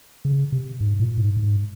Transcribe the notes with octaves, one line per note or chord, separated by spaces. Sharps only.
C#3
C3
G#2
A#2
G#2
G#2